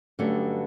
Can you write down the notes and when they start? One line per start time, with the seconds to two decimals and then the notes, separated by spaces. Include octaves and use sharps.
0.19 G2 D3 F#3 A3 C#4